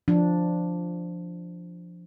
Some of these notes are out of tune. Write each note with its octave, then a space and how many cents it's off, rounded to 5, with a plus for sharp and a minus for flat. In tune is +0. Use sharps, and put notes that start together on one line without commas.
F3 -5 D4 +0